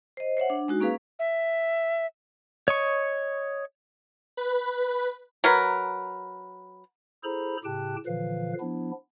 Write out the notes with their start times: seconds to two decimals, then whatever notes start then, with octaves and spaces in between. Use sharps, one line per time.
0.17 C5 D#5
0.37 C5 C#5 E5 F#5
0.50 D4
0.68 G#3 D#4 F#4
0.80 A#3 C#4 G#4 B4 F5
1.19 E5
2.68 C#5 D#5 C#6
4.37 B4
5.44 F#3 A#4 B4
7.24 E4 G#4 A4 C5 A#5 B5
7.64 A2 C#3 G4 G5 A5 F#6
8.06 A#2 D3 E3 F3 B4 F5
8.60 F3 B3 D4 E4